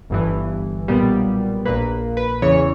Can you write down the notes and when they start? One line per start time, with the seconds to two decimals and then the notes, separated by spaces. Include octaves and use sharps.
0.10 G1 G2 E3
0.88 B1 A#2 G3 B3
1.65 A#1 A#2 A#3 B4
2.17 B4
2.42 E2 C#3 E3 C#5